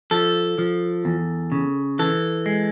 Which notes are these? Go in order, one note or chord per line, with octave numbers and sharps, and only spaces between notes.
F3 A4
F3
E2
C#3
E3 A4
G#3